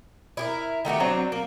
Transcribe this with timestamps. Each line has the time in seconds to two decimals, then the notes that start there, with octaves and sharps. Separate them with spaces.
0.37 E4 G4 A#4
0.85 D#3 A3 F#4 G4
1.00 F#3 C4 D4 F#4
1.32 A#3